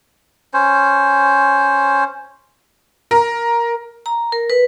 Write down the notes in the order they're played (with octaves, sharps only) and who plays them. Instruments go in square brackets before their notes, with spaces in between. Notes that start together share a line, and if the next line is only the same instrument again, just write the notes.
[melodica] C#4 C5
[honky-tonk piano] A#4
[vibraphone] A#5
A#4
B4